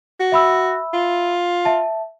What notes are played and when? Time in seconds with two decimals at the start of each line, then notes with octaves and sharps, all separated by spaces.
0.20 F#4
0.32 E5 B5 E6
0.94 F4
1.65 E5 A5